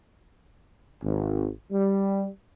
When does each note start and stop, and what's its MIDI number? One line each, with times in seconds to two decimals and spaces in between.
1.03 1.47 32
1.72 2.26 55